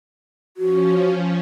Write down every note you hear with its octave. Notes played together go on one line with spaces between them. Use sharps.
F3 C#4 F#4